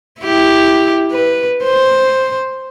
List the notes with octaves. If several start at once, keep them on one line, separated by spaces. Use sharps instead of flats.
E4 G4
B4
C5